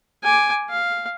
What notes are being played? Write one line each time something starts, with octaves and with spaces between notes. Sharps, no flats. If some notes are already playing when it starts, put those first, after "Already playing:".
G#5 D6
F5